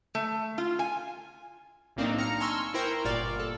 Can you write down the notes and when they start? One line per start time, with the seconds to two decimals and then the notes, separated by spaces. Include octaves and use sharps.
0.15 A3
0.58 F4
0.79 G#5
1.96 B1 A2 A#3 C4 D4 D#4
2.18 A#5 F6 C#7
2.40 G#5 A5 C6 C#6 E6 F6
2.74 E4 A#4 C5 G5 C#6
3.05 G1 A#2 F4 D5 F5
3.39 A4